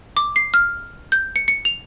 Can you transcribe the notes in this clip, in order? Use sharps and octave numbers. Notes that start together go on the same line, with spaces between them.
D6
C7
F6
G6
C#7
C#7
F7